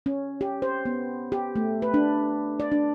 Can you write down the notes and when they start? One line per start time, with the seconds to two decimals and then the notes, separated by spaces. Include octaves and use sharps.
0.06 C#4
0.41 G4
0.62 C5
0.85 B3
1.32 G4
1.56 A3
1.82 B4
1.94 D4
2.60 D5
2.72 D4